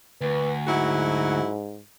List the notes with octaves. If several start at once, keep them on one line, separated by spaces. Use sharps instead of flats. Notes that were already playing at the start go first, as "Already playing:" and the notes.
D2 B4
G#2 F#3 E4 F#4